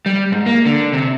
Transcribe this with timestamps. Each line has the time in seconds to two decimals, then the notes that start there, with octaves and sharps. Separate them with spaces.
0.06 G3
0.32 G#2
0.46 A#3
0.66 D3
0.93 C3